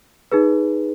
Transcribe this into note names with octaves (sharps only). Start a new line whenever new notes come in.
D#4 G#4 B4